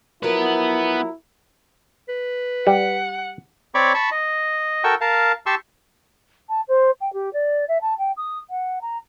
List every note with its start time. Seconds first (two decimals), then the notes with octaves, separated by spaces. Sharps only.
0.23 F3 F#3 B3 E4 A#4 B4
2.08 B4
2.67 G3 F#5
3.75 C4 C#5 D5 B5 C#6 D6
3.94 A5 B5 C#6
4.11 D#5
4.84 F#4 A4 A#4 G5 C#6 E6
5.01 A#4 F5 A5
5.46 G4 A5 C6 C#6 E6
6.49 A5
6.68 C5
7.00 G5
7.13 G4
7.33 D5
7.68 E5
7.81 A5
7.98 G5
8.17 D#6
8.50 F#5
8.81 A#5